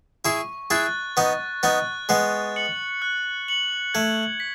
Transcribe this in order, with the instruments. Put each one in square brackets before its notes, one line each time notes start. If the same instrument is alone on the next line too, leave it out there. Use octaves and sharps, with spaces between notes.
[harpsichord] E4 G#4 [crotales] C#6
[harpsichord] E4 G#4 [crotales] F#6 A6
[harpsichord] B3 D#4 [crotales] C#6
[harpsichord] B3 D#4 [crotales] F#6 A6
[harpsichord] G#3 B3 [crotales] F#6
[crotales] C#7 F#7
F#6
C#7 F#7
[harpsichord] A3 [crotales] G#6
[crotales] B6